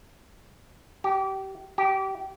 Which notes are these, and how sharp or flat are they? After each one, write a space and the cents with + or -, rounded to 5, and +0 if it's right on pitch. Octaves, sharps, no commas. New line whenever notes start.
G4 -25
G4 -25